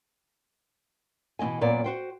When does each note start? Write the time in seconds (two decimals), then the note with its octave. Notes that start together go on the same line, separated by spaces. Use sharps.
1.39 B2 E3 C4 D#5 G#5
1.61 F#2 A#2 B3 D5
1.84 F#4 C5 G5